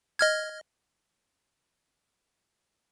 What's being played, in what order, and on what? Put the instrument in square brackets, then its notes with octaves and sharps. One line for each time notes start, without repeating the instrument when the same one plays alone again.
[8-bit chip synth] D#5 F6 G#6